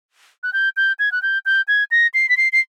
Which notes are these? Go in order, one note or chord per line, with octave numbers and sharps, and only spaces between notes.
F#6
G6
G6
G#6
F#6
G6
G6
G#6
A#6
C7
B6
C7
C7